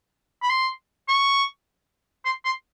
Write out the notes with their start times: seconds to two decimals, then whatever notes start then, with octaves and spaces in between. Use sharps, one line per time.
0.43 B5
0.50 C6
1.08 C#6
2.25 C6
2.45 C6